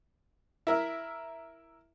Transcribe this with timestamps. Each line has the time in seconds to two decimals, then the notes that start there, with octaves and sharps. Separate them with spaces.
0.67 E4 A#4 E5